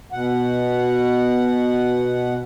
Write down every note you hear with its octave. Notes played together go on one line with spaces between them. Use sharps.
B2 F#5